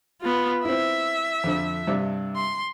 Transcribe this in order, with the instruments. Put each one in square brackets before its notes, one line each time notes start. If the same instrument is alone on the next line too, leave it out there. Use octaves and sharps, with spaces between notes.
[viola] B3 F4
[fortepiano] C4 E4 [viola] E5
[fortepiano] F2 D3 F3
G2 C3 D4
[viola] C6